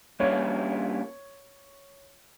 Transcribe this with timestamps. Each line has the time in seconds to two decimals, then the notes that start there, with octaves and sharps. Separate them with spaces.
0.20 G2 G3 A#3 C#4 E4 C#5